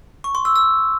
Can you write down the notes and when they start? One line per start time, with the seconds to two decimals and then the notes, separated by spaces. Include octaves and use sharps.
0.24 C#6
0.35 C6
0.45 E6
0.56 E6